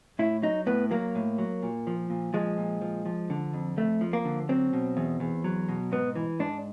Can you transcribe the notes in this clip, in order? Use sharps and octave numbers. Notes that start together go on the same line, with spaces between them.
A2 E4
F#3 D#4
A2 B3
F#3 A#3
A2
F#3
A#2
F3
A#2
F3 G#3
A#2
F3
F3
D3
F2
F2 A3
F3
A#3
D3
F#3 C4
B2
E2
E2
F#3
B2
G#2 B3
E3
G#2 D4